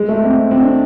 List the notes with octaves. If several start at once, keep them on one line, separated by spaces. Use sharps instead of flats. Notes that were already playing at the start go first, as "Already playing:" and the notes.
Already playing: G#3
A3
C4
C4
D4